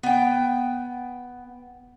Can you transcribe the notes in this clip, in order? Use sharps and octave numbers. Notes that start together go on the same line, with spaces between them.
B3 G5